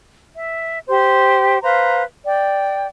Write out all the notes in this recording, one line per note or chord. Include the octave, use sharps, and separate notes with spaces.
E5
G4 C5
B4 C5 F5 A#5
D5 G5